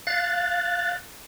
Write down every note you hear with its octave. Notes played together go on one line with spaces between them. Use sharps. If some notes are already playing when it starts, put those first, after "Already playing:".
F5 F#6 A6